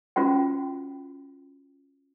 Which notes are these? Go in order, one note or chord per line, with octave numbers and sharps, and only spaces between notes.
C#4 F4 F#4 G5